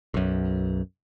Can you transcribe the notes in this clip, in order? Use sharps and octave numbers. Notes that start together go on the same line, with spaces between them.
B1 F#2